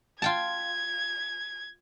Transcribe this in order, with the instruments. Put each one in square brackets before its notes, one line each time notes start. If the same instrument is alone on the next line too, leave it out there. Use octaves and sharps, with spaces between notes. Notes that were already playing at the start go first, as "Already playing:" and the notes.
[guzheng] F4 G5 A5 [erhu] G#6